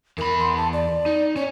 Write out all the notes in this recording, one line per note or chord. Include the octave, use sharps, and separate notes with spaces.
E2 A#4 B5
C6
A5
D5
D#4
C#4 C#5